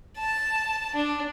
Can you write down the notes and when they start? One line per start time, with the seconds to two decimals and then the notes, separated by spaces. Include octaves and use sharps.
0.18 A5
0.95 D4